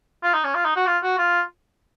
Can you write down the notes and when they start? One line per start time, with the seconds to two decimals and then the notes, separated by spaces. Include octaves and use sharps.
0.23 F4
0.34 D#4
0.44 C#4
0.55 F4
0.65 D#4
0.76 F#4
0.87 F4
1.03 F#4
1.19 F4